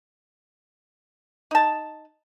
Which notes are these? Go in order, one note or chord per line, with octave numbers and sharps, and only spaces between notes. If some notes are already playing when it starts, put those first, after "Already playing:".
D#4 A5